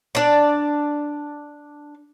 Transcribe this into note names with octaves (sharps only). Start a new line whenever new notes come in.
D4 D5